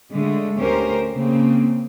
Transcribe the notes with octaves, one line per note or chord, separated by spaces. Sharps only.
D3 G#3 A3
D2 C#4 G4 A#4 C5
C#3 A#3 C4